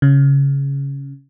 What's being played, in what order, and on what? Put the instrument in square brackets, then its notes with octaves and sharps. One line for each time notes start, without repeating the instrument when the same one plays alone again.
[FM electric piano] C#3